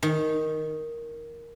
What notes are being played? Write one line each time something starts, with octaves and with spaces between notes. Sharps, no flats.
D#3